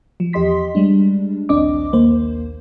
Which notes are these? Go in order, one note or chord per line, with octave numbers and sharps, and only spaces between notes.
F3
E2 G4 D#5 C6 B6
G3 G#3 D4
A#1 D#2 C4 D4 D#5 D6
A#1 D#2 A#3 C5